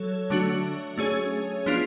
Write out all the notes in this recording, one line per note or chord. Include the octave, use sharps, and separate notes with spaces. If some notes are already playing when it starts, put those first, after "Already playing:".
Already playing: F#3 A4 C#5
D3 F#3 A3 D4 F#4
A3 C#4 G#4 C#5
F3 B3 D4 F4